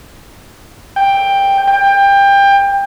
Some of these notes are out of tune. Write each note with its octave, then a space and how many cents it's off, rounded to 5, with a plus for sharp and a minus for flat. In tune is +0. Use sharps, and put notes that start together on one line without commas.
G5 +10
G5 +25